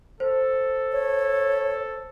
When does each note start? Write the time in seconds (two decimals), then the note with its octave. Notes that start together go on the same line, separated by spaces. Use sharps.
0.20 A4 C5
0.92 C#5